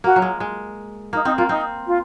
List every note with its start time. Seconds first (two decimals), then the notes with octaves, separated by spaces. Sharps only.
0.04 A#3 F#4
0.16 F#3
0.22 G#3
0.40 G#3
1.13 A#3 D#4
1.25 C4 D#4
1.37 A#3 F4
1.49 C4 D#4
1.86 F4